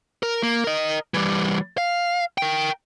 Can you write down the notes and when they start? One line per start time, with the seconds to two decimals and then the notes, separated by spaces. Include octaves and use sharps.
0.23 A#4
0.43 A#3
0.64 A#4 D#5
1.14 E3 G3
1.78 F5
2.38 A#4 G5